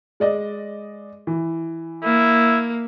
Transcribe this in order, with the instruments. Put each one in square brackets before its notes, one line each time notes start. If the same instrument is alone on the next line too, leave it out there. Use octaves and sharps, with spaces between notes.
[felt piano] G#3 D5 D#5
E3
[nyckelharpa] A#3 [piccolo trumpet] E4